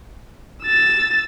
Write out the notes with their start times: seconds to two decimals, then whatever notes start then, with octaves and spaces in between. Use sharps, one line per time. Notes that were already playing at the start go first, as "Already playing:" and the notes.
0.63 E6 A6